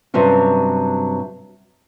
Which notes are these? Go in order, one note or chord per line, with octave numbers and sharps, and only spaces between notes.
G2 C3 F#3 C4 C#4